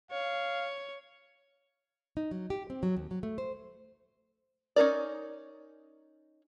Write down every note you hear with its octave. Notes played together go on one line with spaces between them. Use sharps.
C#5 F5
D#4
F#3
G4
C4
F#3
D#2
F#3
A3
C5
C#4 D#4 A#4 D5